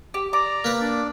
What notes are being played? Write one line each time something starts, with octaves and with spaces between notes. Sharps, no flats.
G4
D5 A#5 D6
A#3 B4
D4 D5